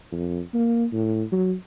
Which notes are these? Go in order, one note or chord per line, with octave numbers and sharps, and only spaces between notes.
F2
A#3
A2
F#3